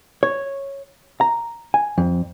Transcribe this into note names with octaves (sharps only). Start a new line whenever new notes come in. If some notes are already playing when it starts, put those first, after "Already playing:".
C#5
A#5
G#5
F2